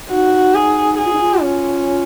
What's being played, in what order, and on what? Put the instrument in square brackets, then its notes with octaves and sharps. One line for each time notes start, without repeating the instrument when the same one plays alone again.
[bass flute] D#4 [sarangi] F#4
[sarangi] G#4
G#4
[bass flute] F4
D#4
F4
[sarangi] C#4